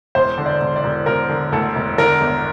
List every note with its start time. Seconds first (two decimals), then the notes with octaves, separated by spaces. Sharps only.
0.15 E1 C5
0.38 D3
0.46 D5
0.61 E1
0.76 D5
0.84 E1
1.06 E1 A#4
1.29 D3
1.52 D2 A4
1.75 E1
1.98 D3 A#4
2.21 G1